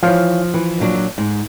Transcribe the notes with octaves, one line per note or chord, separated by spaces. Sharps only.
E3 F3 C#5 F5
E3
A#2 F#3 D4
G#2